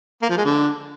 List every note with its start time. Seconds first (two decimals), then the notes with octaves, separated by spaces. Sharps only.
0.22 A#3
0.29 F3
0.37 G#3
0.45 D3